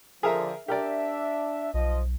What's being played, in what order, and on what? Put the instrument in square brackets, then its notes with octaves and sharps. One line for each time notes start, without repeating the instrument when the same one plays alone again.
[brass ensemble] D3 F3 [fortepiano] G#4 A#4 E5
[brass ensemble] D4 E5 [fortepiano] G4 A#4 D5
[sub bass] B1 [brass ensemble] F3 D#5